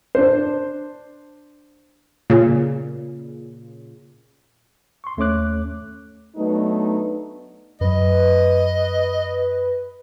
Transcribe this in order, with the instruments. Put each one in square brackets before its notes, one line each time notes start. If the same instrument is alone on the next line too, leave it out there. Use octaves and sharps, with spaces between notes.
[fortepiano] D4 C5
[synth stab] A#2 C#3
[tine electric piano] C6 C#6
D#2 A3 C#4 C#5 D6 F#6
[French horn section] F#3 A3 B3 D4 D#4
[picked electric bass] F#2 F#3 [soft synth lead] B4 [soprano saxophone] D#5